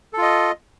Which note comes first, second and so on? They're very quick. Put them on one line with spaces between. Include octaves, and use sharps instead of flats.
A4 F4 D#5